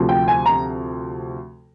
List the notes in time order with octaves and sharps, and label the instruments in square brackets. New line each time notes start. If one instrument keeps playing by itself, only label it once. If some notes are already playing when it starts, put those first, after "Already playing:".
Already playing: [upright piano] D2 C3 F3
G5
G#5
A#5